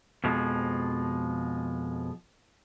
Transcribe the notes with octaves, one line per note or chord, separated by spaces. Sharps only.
F2 B2 F3 G#3